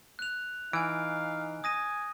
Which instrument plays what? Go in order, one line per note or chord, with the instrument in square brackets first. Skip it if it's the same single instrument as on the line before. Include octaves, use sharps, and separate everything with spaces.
[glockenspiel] F#6 F7
[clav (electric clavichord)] E3 [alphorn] D#4 [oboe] F5 [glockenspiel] G#5 D7
[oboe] G#5 [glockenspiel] D#6 A#6 D#7